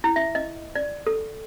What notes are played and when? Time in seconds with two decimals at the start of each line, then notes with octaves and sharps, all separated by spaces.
0.04 E4
0.16 E5
0.35 D#5
0.75 D5
1.07 A4